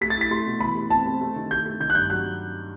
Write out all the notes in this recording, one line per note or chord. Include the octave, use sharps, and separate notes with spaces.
A3 B6
A6
E4
B6
A3 C6
B2
E3 B5
A3
C4 A5
C4
A3
D#3
A3 G6
A3
D#3 G6
F#6
G2 G6
F#3 F#6